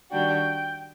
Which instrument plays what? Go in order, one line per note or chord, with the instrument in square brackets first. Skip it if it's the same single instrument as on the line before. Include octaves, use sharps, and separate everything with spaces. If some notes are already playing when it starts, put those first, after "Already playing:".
[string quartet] D#3 G3 D4 F#4 [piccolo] G5